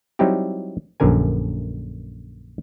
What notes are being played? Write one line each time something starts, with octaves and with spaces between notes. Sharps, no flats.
F#3 G3 C4 D#4 E4 G4
A#1 F#2 D3 A#4 G#5